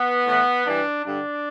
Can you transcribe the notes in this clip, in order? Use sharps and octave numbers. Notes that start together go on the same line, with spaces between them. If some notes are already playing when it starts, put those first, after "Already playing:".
Already playing: B3
A2 E3
G2 E3 D4
G2 D3 D4